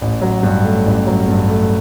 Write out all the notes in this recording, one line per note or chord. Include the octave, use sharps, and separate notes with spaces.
A1
F#3
G2
A3
A1
F#3
G2
A3